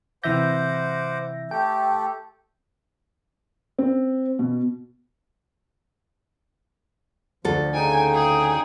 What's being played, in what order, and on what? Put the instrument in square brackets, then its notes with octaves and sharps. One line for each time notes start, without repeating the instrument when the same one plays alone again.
[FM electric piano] C3 E3 A#6 [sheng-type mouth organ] C5 F#5 D6 [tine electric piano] E5 G6
[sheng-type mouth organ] A3 G4 A4 [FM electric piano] G5
[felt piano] C4
B2
[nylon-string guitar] D2 A4 [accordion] F3
[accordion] C#3 D#4 G5 [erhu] G#5
[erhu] G#4